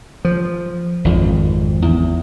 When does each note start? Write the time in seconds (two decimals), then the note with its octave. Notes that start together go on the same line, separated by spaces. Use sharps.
0.25 F3
1.05 G#1 F2
1.82 E2